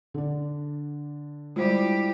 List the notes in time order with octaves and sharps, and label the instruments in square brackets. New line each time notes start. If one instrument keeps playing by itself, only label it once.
[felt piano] D3 D4
[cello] G3 G4 [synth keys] G#3 E4 [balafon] F4 C5